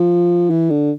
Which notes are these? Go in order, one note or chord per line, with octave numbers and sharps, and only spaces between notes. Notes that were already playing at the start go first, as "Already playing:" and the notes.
Already playing: F3
E3
D3